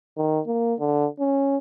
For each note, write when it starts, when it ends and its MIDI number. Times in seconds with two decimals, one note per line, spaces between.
0.17 0.40 51
0.47 0.74 58
0.80 1.07 50
1.20 1.57 61